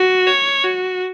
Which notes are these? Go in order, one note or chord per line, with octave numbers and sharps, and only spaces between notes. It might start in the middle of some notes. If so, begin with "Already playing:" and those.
Already playing: F#4
C#5
F#4